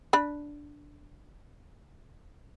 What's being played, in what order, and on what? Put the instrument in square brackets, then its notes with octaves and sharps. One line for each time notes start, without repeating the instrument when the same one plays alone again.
[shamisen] D4 B5